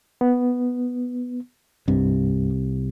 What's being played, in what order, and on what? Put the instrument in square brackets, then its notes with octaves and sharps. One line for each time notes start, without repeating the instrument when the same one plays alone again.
[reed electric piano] B3
[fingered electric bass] C2 C3 [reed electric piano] G2